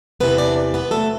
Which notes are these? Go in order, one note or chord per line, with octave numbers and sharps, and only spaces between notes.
E2 C3 E3 B3 B4
D4 D5
B3 B4
E2 C3 E3 A3 A4